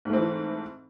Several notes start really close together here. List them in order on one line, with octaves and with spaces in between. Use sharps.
G#2 A3 C4 E3